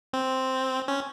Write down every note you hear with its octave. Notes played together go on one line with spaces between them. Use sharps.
C4
C#4